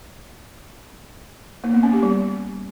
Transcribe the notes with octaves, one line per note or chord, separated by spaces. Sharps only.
A#3
B3
C#4
G4
G3